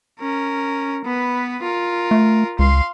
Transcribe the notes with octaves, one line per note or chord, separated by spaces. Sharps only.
C#4 A#4
B3 B4
F4 A#4
A3
C#2 F5 C6